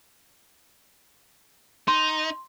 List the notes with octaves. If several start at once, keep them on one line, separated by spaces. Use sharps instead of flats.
D#4 C6